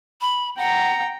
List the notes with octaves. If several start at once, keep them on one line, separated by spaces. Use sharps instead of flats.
B5
F#5 G5 A#5